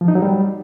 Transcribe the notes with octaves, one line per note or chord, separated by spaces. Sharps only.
F3
D#4
F#3
G3